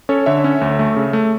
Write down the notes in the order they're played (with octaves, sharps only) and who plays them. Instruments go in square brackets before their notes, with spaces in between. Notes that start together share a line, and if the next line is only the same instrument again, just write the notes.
[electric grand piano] C#4 A4 C#5
D3 C#5 E5
C#4
D2
A3
C#3
A3